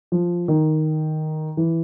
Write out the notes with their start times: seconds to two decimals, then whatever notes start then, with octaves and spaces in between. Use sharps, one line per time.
0.12 F3
0.48 D#3
1.57 E3